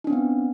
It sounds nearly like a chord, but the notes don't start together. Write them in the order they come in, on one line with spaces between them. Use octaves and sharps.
D#4 D4 C4 B3